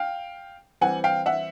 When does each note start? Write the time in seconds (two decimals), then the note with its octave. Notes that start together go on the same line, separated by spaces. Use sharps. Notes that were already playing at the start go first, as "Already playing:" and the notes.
Already playing: F5 G5
0.81 E3 G3 C4 F#5 G#5
1.04 F5 G5
1.26 E5 F#5